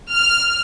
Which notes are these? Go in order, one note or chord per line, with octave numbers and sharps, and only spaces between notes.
F6